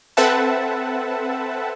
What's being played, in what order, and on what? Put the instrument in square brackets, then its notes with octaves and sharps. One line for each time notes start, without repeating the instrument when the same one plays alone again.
[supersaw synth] C4 A4 B4 E5 F#5 A5